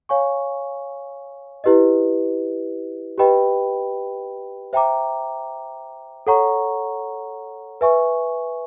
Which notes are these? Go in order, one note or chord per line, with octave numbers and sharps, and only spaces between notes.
C#5 F5 G#5 C#6
E4 G4 B4 D#5
G4 B4 D#5 G5 B5
C5 E5 G5 A#5 D6
A4 C#5 F#5 A#5 C#6
B4 E5 G#5 C#6